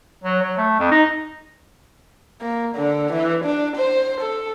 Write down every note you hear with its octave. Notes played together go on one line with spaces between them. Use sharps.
F#3
F#3
A3
F2
D#4
A#3
D3
E3
D4
C5
A4